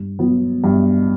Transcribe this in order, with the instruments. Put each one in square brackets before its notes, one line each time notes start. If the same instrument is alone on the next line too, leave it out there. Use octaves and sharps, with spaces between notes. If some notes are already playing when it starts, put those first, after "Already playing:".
Already playing: [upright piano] G2
F#3 B3
G2